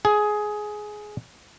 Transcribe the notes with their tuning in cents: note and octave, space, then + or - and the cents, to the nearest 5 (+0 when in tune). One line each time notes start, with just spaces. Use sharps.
G#4 +15